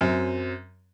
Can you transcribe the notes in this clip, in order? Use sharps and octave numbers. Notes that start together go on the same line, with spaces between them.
F#2 F#3 C4